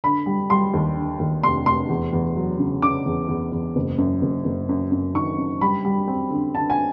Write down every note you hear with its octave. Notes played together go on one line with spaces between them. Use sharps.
D3 B5
G3
G3 C6
D#2
D3
D#2
F1 C6
F1 C6
E2
E2
F#3
C#3
C#3 D6
E2
E2
E2
F#1
F#2
F#1
F#1
F#2
F#2
D#3 C#6
F#2
G3 B5
G3
C4
D3
D3 A5
G#5